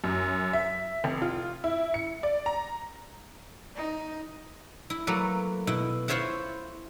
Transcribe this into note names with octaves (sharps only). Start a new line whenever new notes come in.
F#2
E5
F1
F4
E4
C#7
D5
A#5
D#4
E4
F#3 A3 A#3 A4 B4
B2 E4
E4 F4 C5 C#5 E5 F#5